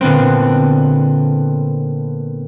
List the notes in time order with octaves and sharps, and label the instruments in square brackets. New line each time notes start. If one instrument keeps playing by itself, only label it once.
[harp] A#2 D3 B3 C4